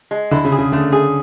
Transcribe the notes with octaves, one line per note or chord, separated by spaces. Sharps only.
G#3
D3 E4
C#3
G#4
C#3
D3 A3
G#4